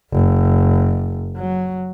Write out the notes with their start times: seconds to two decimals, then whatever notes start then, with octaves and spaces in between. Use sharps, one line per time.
0.12 F#1
1.36 F#3